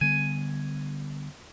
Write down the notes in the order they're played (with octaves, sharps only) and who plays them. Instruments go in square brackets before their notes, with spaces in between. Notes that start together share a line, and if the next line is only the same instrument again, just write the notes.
[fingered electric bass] D3 G3 B3 [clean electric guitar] G#5